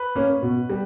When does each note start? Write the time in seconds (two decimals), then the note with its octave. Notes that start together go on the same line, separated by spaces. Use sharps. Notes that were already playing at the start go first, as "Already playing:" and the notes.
Already playing: B4
0.15 A#3 C#4
0.42 B2
0.70 G3